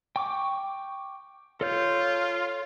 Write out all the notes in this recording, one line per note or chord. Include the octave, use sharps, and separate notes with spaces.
G5 C#6 D6
F4 A4 C#5 G6